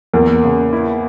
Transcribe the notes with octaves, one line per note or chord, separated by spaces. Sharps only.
E2 A#3
C#3
E4